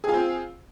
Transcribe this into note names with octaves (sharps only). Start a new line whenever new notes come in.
C4 F4 G#4